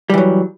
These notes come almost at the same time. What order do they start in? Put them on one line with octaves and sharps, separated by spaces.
G3 E3 F#3